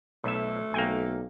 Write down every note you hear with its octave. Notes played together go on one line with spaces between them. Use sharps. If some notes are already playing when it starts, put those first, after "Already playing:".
B1 A3 E5
B1 A#3 G5 G#5